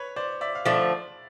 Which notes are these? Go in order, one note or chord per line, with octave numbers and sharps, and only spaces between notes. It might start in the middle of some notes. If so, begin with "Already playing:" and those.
Already playing: B4 C#5
C5 D5
D5 E5
F5
D3 F3 A3 D5 E5